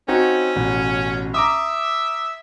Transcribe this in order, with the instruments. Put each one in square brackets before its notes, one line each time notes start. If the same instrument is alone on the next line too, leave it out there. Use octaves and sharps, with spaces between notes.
[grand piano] C4 D#4 F#4 [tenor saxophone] C#4
[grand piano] A1 B2
[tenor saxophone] E5 [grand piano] A#5 D6 D#6